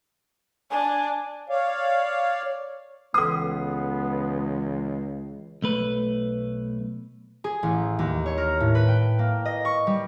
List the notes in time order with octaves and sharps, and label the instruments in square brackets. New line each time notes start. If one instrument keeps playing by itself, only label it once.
[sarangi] D4 [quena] G#5
[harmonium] C#5 D5 F5
[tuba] C#2 [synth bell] E3 C7 [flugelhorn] B3 [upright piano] D#6
[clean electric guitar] B1 A3 B4
[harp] G#4
A1
D#2
C#5
A#4
A2
B4
G5
A#3
D#5
C#6
G3